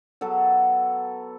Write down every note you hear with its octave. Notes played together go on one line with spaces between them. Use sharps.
F#3 B3 A4